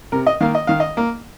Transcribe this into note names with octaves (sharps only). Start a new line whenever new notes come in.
C3 A#4
D#5
D#3 A#3 F5
D#5
D#3 F5
D#5
A#3